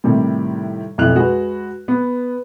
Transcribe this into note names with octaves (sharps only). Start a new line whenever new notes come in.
A2 C3 D#3 G3
B1 F2 E4 F#6 F7
G#3 F#4 G#4 B4
B3